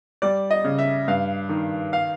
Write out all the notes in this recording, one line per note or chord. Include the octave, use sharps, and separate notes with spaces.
G3 D5
D#5
C#3
E5
G2 F5
D#3
F5